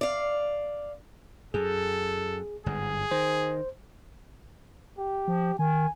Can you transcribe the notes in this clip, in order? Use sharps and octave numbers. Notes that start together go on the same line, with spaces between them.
D5 F5
F#2 G#4 A4
G1 G#2 G#4
D#3 C5
G4
F3
D#3 G#5